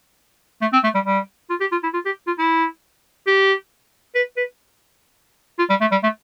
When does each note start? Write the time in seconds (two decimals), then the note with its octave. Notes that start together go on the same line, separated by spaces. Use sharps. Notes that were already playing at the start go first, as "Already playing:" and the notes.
0.61 A3
0.73 C4
0.83 A3
0.94 G3
1.05 G3
1.50 F4
1.60 G4
1.72 F4
1.83 E4
1.93 F4
2.05 G4
2.27 F4
2.38 E4
3.26 G4
4.15 B4
4.37 B4
5.59 F4
5.69 G3
5.81 A3
5.92 G3
6.03 A3